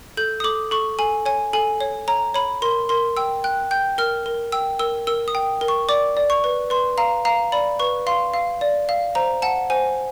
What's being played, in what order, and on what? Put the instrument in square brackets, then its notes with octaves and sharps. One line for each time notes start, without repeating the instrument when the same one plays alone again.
[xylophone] A4 G6
D#6
A4 D6
A4 C#6
A4 G#5
C#5 G#5
A4 G#5
C#5
C#5 A#5
C#5 B5
A#4 C6
A#4 C6
G5 E6
G5 F#6
G5 G6
A#4 F6
A#4
G5 E6
A#4 E6
A#4 E6
D#6
G5
A#4
C#6
D5 D6
D5
C#6
B4
B4 C6
F5 A#5
F5 A#5
D5 B5
B4 C#6
F5 C6
F5
D5
F5
C5 A#5
F#5 A5
C5 G#5